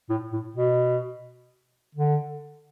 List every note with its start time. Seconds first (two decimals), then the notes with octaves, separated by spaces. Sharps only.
0.09 A2
0.32 A2
0.56 B2
1.95 D3